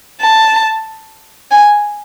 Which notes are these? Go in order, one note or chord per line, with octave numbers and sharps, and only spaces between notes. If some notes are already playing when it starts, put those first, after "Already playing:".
A5
G#5